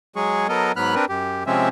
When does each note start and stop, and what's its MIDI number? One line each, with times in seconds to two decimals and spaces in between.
0.16 0.47 54
0.16 0.47 56
0.16 0.47 68
0.16 0.47 85
0.49 0.72 54
0.49 0.72 59
0.49 0.72 69
0.49 0.72 70
0.49 0.72 75
0.76 0.95 44
0.76 0.95 54
0.76 0.95 59
0.76 0.95 83
0.76 0.95 89
0.76 0.95 90
0.95 1.05 60
0.95 1.05 62
0.95 1.05 70
0.95 1.05 71
1.09 1.44 42
1.09 1.44 67
1.47 1.69 48
1.47 1.69 53
1.47 1.69 56
1.47 1.69 60
1.47 1.69 61
1.47 1.69 76